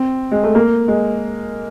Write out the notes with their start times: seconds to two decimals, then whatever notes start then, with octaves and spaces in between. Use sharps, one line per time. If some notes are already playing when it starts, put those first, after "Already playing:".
Already playing: C4
0.31 G#3
0.44 A3
0.55 A#3
0.88 G#3